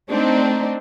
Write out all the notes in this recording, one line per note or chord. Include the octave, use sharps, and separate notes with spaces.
A3 C4 D4 D#4